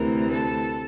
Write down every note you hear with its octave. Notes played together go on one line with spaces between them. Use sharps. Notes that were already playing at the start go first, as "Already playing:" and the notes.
Already playing: D2 C3 E3 A#4
A4